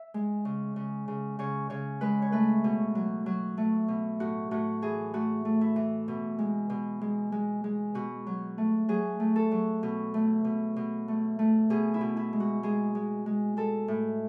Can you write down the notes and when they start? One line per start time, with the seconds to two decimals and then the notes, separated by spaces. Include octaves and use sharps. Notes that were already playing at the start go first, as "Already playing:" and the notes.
Already playing: E5
0.14 G#3
0.45 C#3
0.76 C#3
1.08 C#3
1.39 C#3 C#5
1.70 C#3 C#5
2.01 G#3 B4
2.22 C#5
2.32 A3 B4
2.64 B2
2.95 F#3
3.26 F#3
3.58 A3
3.88 B2
4.20 A2 F#4
4.51 A2 F#4
4.82 E3 G#4
5.14 A3 F#4
5.45 A3
5.61 E4
5.76 E3
6.08 B2
6.39 G#3
6.70 B2
7.02 G#3
7.32 G#3
7.64 G#3
7.95 B2 F#4
8.27 F#3
8.58 A3
8.89 F#3 G#4
9.20 A3
9.36 A4
9.52 F#3
9.83 B2
10.14 A3
10.45 B2
10.76 B2
11.08 A3
11.39 A3
11.70 B2 G#4
11.94 E4
12.01 B2
12.17 E4
12.33 G#3
12.40 F#4
12.63 G#3 G#4
12.95 G#3
13.26 G#3
13.57 G#3 A4
13.88 A2